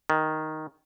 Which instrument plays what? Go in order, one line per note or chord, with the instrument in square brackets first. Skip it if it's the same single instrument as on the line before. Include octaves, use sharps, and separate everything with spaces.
[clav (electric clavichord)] D#3